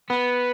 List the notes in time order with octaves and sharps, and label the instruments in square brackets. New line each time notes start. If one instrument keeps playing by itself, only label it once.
[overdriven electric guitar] B3